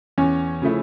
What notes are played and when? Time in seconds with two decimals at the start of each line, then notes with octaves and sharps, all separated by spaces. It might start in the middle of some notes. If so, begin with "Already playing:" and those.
0.18 E2 C#4
0.62 C#3 F3 A3 E4